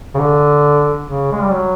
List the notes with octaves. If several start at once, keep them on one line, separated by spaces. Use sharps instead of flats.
C#3
D3
C#3
G#3
G3
F#3